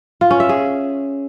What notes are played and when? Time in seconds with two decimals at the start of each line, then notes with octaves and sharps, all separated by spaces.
0.21 F4
0.31 C#4
0.40 E5
0.49 G#4